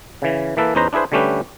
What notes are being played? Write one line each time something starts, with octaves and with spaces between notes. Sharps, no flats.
C#3 E3
E3 A#3 A4 B4
E2 C#4 D#4 B4 C5 A#5
D4 E4 G#4 B4 C5
D3 G3 A3 C#4 G4 B4